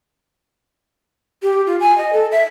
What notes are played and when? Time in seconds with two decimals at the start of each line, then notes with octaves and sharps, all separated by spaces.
1.43 G4
1.67 F4
1.80 G#5
1.98 D#5
2.13 A4
2.32 E5